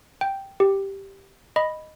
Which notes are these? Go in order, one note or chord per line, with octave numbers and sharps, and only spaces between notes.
G5
G4
D#5 B5